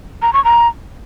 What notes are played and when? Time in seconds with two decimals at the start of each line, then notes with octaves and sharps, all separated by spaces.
0.22 A#5
0.33 C#6
0.45 A#5